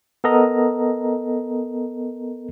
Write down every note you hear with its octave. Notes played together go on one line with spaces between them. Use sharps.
B3 A4 A#4 D#5 A#5